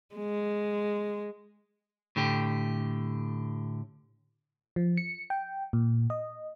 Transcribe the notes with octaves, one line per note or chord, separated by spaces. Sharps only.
G#3
A2 D3 G4
F3
C#7
G5
A#2
D#5